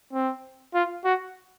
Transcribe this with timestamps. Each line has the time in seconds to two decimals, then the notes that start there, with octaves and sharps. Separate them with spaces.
0.13 C4
0.75 F4
1.05 F#4